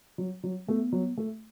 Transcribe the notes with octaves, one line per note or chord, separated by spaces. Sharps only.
F#3
F#3
A3 B3
F#3
A3